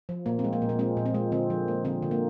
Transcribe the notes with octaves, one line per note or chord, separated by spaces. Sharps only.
F3
A#2 A#3
C4
G#3
A#3
A#2
A#3
G#3 C4
A#2
C4
G#3
D3 C4
F3
A#3
D3 C4
D3
A#3